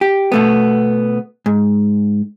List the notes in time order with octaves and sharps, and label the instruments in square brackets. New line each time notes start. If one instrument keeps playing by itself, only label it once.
[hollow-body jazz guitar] G4
B2 A3 B3
G#2